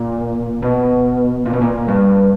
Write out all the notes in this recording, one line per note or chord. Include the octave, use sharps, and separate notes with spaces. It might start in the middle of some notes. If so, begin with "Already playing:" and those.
Already playing: A#2
B2
A#2
B2
A#2
G2